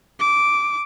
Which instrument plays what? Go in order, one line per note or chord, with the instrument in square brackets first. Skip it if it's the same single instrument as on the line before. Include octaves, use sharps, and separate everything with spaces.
[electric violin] D6